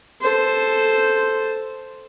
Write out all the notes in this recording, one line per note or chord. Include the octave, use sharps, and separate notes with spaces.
A4 C5